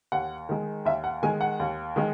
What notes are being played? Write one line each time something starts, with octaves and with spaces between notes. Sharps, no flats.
D#2 F#5
D#3 G#3
D#2 E5
F#5
D#3 G#3 G#5
F#5
D#2
D#3 G#3